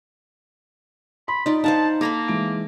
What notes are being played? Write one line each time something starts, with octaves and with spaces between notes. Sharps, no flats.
B5 C6
D#4 F4 D5
D#4 C5 F5 F#5 A5
A#3 A4 A#5 B5
E3 G#3 D7